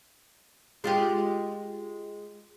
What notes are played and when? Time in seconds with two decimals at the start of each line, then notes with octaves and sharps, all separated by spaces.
0.84 G#3 F4 G4